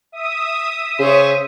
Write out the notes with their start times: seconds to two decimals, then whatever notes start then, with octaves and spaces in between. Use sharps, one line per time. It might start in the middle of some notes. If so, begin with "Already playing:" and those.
0.12 E5 D#6
0.99 C#3 C5 C#5